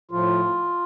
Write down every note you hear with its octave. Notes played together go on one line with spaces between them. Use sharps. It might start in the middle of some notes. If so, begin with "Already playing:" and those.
A2 F3 F4